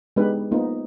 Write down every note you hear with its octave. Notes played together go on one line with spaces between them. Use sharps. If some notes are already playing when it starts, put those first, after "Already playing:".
G#3 B3 D4 D#4 G4 B4
A#3 B3 D#4 F4 C5